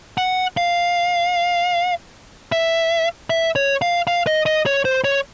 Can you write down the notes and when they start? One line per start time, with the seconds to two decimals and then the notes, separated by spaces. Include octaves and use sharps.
0.18 F#5
0.57 F5
2.52 E5
3.30 E5
3.56 C#5
3.82 F5
4.07 F5
4.27 D#5
4.46 D#5
4.66 C#5
4.85 C5
5.04 C#5